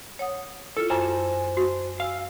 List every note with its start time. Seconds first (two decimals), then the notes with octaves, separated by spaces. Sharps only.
0.19 C#5 F#5 D#6
0.77 E4 F4 A4
0.90 F#2 F4 C5 G#5 A5
1.57 F#4
2.00 F5 G#5 E6